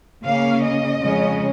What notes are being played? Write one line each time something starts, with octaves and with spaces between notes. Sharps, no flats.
C#3 A#3 C#4 F5
D#5
F2 C#3 G#3 C#4